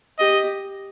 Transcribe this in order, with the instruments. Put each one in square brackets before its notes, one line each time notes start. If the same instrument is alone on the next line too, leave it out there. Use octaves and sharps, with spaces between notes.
[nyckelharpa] G4 [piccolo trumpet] D#5